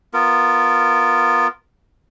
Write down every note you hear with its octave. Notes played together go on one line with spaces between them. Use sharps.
B3 F4 A#4